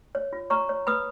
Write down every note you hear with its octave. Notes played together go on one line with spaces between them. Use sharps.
C#5
F4
C#5 A#5 C#6
C#5
B4 B5 D#6